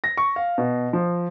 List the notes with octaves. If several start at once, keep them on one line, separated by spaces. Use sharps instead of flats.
A#6
C#6
F5
B2
F3